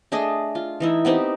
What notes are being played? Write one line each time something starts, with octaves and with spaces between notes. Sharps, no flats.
A3 D4 G#4 D#5
F4
E3 D#4 E4
B3 C4 D#4 G4